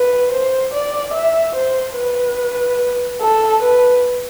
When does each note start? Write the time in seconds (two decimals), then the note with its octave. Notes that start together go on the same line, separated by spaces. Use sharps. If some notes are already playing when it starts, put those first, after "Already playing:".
Already playing: B4
0.31 C5
0.73 D5
1.14 E5
1.56 C5
1.97 B4
3.22 A4
3.62 B4